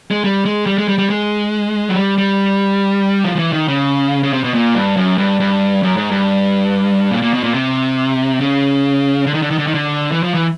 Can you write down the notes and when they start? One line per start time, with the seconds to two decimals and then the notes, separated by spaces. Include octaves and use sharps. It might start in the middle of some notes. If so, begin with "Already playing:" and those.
0.11 G#3
0.24 G3
0.45 G#3
0.66 G3
0.78 G#3
0.88 G3
0.99 G3
1.10 G#3
1.89 F#3
1.95 G3
2.18 G3
3.24 F3
3.35 F3
3.39 E3
3.53 D#3
3.68 C#3
4.23 C#3
4.33 C3
4.44 B2
4.54 A#2
4.75 G2
4.97 F#2
5.18 G2
5.40 G2
5.83 F#2
5.97 G#2
6.11 G2
7.11 A#2
7.22 A#2
7.34 B2
7.44 A#2
7.54 C3
8.41 C#3
9.26 D3
9.34 D#3
9.42 D3
9.50 D#3
9.58 D3
9.67 D#3
9.74 D3
10.12 E3
10.23 F3
10.34 E3